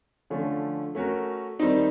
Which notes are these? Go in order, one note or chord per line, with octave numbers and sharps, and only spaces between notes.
D3 F3 A3 C#4
A3 C#4 F#4 A#4
D#3 G3 C4 D#4